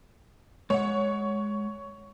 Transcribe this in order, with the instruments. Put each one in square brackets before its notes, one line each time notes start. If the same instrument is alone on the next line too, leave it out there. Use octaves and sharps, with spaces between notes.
[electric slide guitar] G#3 F#5 [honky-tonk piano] C#5